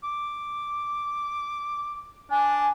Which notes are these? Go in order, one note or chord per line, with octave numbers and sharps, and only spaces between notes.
D6
D4 G#5